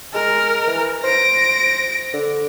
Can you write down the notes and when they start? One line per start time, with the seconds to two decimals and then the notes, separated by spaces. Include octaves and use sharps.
0.14 G#3 A#4
0.67 E3
1.04 C5 A#6 D7
2.13 D3